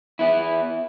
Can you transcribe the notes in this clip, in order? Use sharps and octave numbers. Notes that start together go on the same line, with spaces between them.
B3 E4